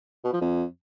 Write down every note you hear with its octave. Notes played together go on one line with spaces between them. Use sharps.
B2
F3
F2